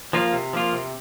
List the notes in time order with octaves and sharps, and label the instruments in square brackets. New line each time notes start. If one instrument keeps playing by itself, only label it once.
[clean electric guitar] F3 A#3 F4
C3
F3 A#3 F4
C3